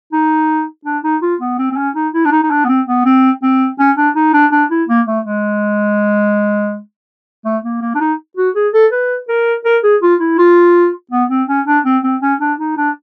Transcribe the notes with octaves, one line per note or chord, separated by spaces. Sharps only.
D#4
D4
D#4
F4
B3
C4
C4
C#4
D#4
E4
D4
D#4
D#4
D4
B3
C4
B3
C4
C4
C#4
D4
D#4
D4
D4
E4
A#3
A3
G#3
A3
A#3
A#3
D4
D#4
F#4
G#4
A4
B4
A#4
A#4
G#4
F4
E4
F4
B3
C4
C#4
D4
C4
C4
C#4
D4
D#4
D4